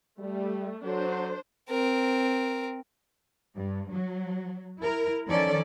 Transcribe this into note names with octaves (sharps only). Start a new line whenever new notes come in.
G3 A3
F#3 D4 A4 C5
C4 A#4
G2
F#3
E4 A#4
D#3 F3 C#4 A4 D5